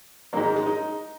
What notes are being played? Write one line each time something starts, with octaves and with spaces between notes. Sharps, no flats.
G#2 D#3 F#3 A#3
G#3
G#3
D#4